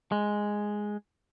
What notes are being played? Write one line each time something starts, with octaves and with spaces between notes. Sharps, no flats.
G#3